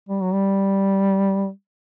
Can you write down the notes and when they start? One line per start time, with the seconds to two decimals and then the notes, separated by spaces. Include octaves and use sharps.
0.09 G3
0.21 F#3
0.33 G3